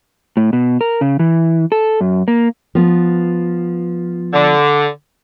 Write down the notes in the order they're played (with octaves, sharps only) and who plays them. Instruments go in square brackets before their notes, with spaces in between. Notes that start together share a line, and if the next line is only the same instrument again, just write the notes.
[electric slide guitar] A2
B2
A#4
C#3
E3
A4
F#2
A#3
[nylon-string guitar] F3 B3
[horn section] D3